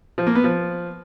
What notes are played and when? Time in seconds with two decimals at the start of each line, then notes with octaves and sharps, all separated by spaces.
0.18 F3
0.27 A#3
0.35 B3
0.44 F3